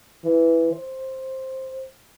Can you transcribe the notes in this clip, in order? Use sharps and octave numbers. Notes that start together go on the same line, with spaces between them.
E3
C5